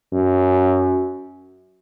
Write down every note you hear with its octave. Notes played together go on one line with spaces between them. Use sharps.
F#2